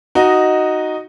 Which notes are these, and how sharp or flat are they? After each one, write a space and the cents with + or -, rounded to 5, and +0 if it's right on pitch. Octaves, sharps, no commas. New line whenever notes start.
D#4 +0 F#4 +0 D#5 -5